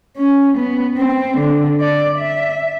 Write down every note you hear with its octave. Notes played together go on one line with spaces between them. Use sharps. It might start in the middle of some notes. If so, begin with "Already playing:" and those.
C#4
B3
C4
D3
D5
E5